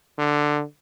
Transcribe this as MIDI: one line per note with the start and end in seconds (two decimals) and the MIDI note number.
0.19 0.63 50